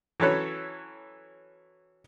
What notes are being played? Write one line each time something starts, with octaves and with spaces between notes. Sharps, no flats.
E3 F#3 C#4 A4 B4 C#5